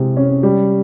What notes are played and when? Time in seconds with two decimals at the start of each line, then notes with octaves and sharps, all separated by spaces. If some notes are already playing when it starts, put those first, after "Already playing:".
Already playing: C3 G#3 E4
0.17 C#4
0.43 G3